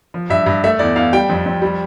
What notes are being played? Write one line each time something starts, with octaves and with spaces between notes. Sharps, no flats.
F3
G2 E5
G2
A3 E5
E2 D5
E2 F5
G3 G5
F2
F2
G3